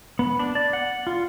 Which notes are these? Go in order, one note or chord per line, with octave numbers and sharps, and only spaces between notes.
B3
D4
D5
F#5
F4